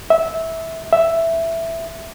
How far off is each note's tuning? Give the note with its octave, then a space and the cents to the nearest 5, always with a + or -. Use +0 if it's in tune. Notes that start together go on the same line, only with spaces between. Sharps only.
E5 -15
E5 +5